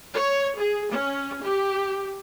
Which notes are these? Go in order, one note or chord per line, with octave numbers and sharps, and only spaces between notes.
C#5
G#4
C#4
G4